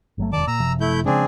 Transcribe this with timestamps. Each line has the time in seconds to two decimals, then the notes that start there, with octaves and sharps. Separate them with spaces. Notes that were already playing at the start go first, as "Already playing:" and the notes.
0.18 G1 F#3 A3
0.33 E1 D#3 D5 A5 D6
0.47 A#2 A#5 E6
0.60 F#1 C3 F3
0.81 A3 E4 G6
1.06 C#3 F3 G#3 C4 D4 G#4